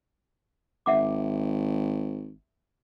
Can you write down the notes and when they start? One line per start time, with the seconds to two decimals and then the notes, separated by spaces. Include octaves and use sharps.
0.86 G#1 E5 F#5 D6